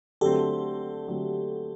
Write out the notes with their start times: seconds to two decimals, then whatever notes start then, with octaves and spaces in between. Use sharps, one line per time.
0.21 D3 F#3 A3 C4 G4 A4
1.08 D3 F#3 A3 C4